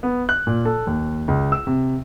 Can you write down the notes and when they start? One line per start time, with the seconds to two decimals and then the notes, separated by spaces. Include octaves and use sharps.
0.03 B3
0.29 F#6
0.47 A#2
0.65 A4
0.87 D#2
1.28 C#2
1.52 E6
1.67 C3